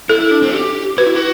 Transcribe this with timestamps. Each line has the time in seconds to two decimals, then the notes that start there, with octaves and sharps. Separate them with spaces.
0.09 E4 A4
0.20 E4
0.31 D4
0.42 C4
0.53 G4
0.98 F#4 B4
1.06 E4
1.15 F#4